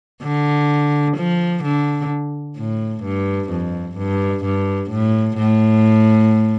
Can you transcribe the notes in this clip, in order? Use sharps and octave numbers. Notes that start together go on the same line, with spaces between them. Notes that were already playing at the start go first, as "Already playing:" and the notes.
D3
F3
D3
A2
G2
F2
G2
G2
A2
A2